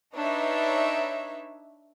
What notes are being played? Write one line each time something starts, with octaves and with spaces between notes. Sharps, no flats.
D4 D#4 B4 C#5 E5